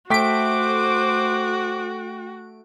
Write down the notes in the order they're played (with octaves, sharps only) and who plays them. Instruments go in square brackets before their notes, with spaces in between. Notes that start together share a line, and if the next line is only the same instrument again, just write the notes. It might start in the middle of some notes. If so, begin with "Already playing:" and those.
[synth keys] A3 D7 [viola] F#4 [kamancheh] C5 D6 [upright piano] G5 B6